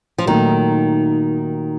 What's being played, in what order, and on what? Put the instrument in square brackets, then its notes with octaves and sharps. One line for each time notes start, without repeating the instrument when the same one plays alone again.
[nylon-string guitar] F3
[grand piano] A#2 F#3 A3 D#4 F#4 [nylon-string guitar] D#3